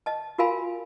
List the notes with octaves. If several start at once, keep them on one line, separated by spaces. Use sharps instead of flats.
D#5 A5
F4 F#4 A#4 F5 G#5 B5